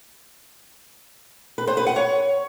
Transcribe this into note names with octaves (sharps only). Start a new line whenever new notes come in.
B4
C5
B4
F#5
C#5